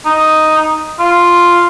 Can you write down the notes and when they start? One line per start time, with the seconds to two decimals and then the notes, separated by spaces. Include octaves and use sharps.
0.05 D#4
1.00 F4